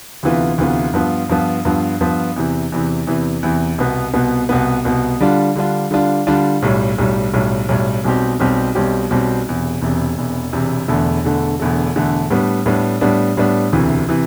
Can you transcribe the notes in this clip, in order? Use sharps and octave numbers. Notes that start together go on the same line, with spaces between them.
D2 C3 E3 B3 F4
D2 C3 E3 B3 F4
G2 F3 B3 F4
G2 F3 B3 F4
G2 F3 B3 F4
G2 F3 B3 F4
E2 C3 E3
E2 C3 E3
E2 C3 E3
E2 C3 E3
C2 B2 B3
C2 B2 B3
C2 B2 B3
C2 B2 B3
D3 G3 D4 F4
D3 G3 D4 F4
D3 G3 D4 F4
D3 G3 D4 F4
B1 A2 G3
B1 A2 G3
B1 A2 G3
B1 A2 G3
B1 B2 G3 C4 G4
B1 B2 G3 C4 G4
B1 B2 G3 C4 G4
B1 B2 G3 C4 G4
E1 E2 C3
E1 E2 C3
E1 E2 C3
E1 E2 C3
E1 E2 D3 A3
E1 E2 D3 A3
E1 E2 D3 A3
E1 E2 D3 A3
A2 G3 B3 D4
A2 G3 B3 D4
A2 G3 B3 D4
A2 G3 B3 D4
E1 D2 C3 E3
C3 E3